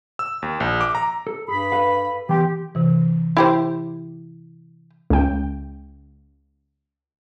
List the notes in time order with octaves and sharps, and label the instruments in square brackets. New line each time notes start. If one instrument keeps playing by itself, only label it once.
[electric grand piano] E6
D#2
A#1
D6
A#5
[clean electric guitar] A4
[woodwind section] G2 B5 [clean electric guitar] G#4
[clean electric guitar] A4 B4 F5
[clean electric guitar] E3 B3 C6 [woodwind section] G4
[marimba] C3 E3
[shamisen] E4 G4 C5
[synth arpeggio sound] C#2 G5